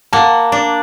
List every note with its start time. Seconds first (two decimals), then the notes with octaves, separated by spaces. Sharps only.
0.13 A#3 F#5 A5
0.52 D4